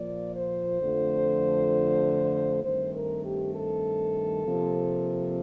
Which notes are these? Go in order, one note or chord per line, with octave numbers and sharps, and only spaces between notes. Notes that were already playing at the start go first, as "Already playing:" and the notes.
Already playing: A#2 F3 A#3 D5
C5
F2 D3 F3 A3
G2 D#3 A3 C4 C5
A#4
G4
A4
C3 F3 A#3